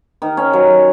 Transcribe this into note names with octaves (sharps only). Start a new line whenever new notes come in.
D#3
C#4
F#3